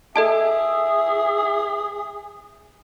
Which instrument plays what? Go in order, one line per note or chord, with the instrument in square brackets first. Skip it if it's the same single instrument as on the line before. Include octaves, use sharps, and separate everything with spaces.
[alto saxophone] G#4 [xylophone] A4 D#5 A5 [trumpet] E5